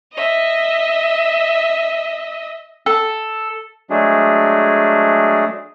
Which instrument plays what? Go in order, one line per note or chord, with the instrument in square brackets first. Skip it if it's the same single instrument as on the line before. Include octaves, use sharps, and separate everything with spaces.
[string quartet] D#5 E5
[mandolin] A4
[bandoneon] F#3 G#3 A3 D4 G#4